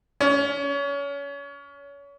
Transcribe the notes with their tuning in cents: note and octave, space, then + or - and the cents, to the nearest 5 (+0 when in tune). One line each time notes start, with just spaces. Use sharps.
C#4 +30